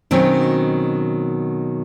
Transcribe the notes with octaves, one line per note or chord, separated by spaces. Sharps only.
B2 D#3 F#3 C4 C#4